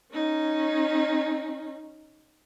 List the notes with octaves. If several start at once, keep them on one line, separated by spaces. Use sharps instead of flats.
C#4 D#4